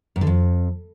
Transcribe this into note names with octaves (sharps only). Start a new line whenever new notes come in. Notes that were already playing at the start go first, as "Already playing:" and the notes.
F#2
D3
F2